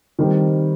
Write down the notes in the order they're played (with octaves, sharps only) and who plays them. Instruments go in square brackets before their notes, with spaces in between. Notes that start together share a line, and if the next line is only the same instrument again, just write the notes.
[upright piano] D#3 G3 C4